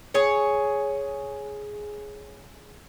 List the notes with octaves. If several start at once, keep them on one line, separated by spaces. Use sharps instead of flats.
G#4 C#5